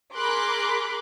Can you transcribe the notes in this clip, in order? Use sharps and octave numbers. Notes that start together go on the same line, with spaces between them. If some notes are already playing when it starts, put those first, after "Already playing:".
G#4 A#4 B5 C6 D6 F#6